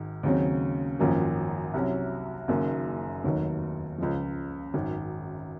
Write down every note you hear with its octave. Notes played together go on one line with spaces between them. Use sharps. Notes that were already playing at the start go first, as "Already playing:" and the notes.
Already playing: G#1 G#2
D#2 C#3 F#3 C4
G#1 F#2 F3 A#3 C#4
C2 C3 F#3 C#4
F#1 F#2 D#3 A#3 D#4
F1 D#2 D#3 F#3
C#2 C#3 F3
G#1 F#2 D#3